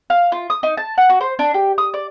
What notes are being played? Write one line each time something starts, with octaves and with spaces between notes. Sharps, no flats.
F5
F4
D#6
D#4
A5
F#5
F#4
C5
D4
G4
D#6
D5